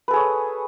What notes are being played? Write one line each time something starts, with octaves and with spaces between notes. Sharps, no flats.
G#4 A4 B4 C#5